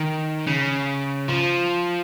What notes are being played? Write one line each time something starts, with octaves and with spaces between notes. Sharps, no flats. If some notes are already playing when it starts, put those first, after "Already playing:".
Already playing: D#3
C#3
F3